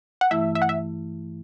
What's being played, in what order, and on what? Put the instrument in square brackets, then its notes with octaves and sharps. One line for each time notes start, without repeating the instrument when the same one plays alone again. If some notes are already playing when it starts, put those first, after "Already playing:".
[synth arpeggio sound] F#5
[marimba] G2 E3 A3 E4 [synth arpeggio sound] E5
[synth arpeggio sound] E5
F#5
E5